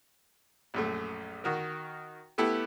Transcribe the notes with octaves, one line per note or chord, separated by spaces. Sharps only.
A#1 F#2 A3
D#3 F#4 A#4
A3 B3 E4 G4 A4 B4